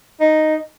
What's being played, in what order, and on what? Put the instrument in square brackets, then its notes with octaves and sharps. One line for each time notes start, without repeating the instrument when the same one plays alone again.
[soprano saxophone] D#4